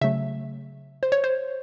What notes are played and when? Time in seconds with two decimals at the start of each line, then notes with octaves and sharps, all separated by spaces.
0.01 C#3 F#3 A3 E5
1.03 C5
1.12 C#5
1.24 C5